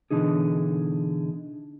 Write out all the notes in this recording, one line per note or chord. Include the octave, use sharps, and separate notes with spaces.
B2 D3 E3 D#4 G#4